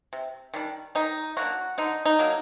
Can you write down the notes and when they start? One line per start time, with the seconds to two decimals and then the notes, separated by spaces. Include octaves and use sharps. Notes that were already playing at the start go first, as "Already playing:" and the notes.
0.13 C3
0.54 D#3 G3 D4
0.95 D#3 D#4
1.37 F#3 A#3 D4 F#4
1.78 D3 D#4
2.06 D#4
2.19 F#3 A#3 D4